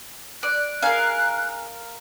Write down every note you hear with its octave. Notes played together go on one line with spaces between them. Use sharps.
D5 F#6
D#4 G#4 A#4 F5 G#5